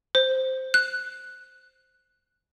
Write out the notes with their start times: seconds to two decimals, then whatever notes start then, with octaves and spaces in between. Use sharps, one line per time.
0.15 C5
0.74 F#6